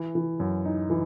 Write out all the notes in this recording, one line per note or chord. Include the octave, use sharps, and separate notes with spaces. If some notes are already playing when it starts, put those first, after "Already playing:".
Already playing: E3
E3
F#2
D#4
E3